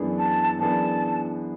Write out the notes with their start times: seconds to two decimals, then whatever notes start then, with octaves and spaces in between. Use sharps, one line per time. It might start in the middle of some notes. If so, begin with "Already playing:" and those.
Already playing: F#2 E3 B3 D4 G#4
0.19 A5
0.59 F#2 E3 B3 D4 G#4 A5